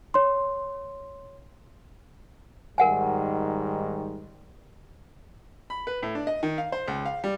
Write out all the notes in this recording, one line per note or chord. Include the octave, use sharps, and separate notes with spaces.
C#5 C6
G#2 D#3 G3 A#4 F#5 G#5
B5
B4
A2
D4
D#5
D#3
F5
C5
C#2
F5
G3